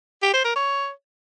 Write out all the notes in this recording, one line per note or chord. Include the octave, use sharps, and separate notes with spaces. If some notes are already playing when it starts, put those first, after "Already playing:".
G4
C5
A#4
C#5